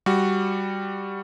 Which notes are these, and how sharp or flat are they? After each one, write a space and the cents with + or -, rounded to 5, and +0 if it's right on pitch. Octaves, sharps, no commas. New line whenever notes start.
G3 +0 F#4 +0